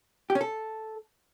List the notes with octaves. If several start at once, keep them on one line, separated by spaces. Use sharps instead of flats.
G4
C#4
A4